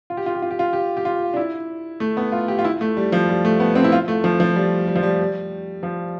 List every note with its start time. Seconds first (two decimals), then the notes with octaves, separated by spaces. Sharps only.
0.10 F4
0.17 G4
0.26 F4
0.35 G4
0.42 F4
0.51 G4
0.59 F4
0.73 G4
0.97 G4
1.05 F4
1.33 D4
1.36 E4
2.00 A3
2.17 B3
2.32 F4
2.48 G4
2.59 F4
2.64 E4
2.81 A3
2.97 G3
3.12 F3
3.29 G3
3.45 A3
3.60 B3
3.75 C4
3.84 E4
3.92 F4
4.08 A3
4.24 F3
4.40 F3
4.56 G3
4.88 G3
4.96 F3
5.03 G3
5.83 F3